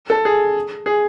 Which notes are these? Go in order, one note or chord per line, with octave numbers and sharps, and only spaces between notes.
A4
G#4
G#4